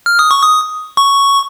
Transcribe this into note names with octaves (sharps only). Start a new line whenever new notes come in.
F6
D#6
C#6
D#6
C#6